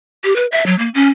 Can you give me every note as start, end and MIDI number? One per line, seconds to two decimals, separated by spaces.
0.24 0.36 67
0.36 0.46 71
0.52 0.66 76
0.66 0.77 54
0.79 0.89 58
0.94 1.09 61